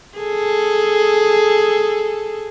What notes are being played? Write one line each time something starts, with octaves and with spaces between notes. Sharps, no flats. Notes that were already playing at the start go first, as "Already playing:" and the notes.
G#4 A4